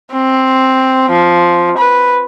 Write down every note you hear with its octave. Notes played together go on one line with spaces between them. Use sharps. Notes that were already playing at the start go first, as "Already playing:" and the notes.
C4
F3
B4